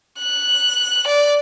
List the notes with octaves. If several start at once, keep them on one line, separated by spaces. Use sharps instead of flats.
F#6
D5